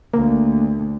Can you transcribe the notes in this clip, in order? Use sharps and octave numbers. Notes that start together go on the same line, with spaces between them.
D2 A#3